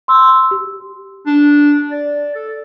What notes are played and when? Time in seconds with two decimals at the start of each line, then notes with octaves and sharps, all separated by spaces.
0.08 C6 E6
0.51 G4
1.26 D4
1.91 D5
2.35 A4